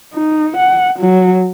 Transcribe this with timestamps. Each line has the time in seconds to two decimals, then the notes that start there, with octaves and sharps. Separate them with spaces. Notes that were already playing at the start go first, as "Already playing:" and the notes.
0.14 D#4
0.57 F#5
0.99 F#3